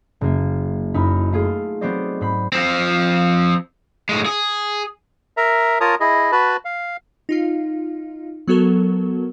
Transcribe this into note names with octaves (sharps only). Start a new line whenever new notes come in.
F#1 A#3
F#2 D#4 E4 A#4 B5
A3 F4 G#4
F#3 B3 C4 C5 D5 D#5
G#2 C5 B5
F3 C4
A2 G#3
G#4
A#4 E5 A#5
F4 A#4 C#5 A5 A#5 D#6
E4 G#4 D#5
F#4 B4 A5 B5
F5
D#4 F4 F5
F#3 B3 F#4 A4 A#4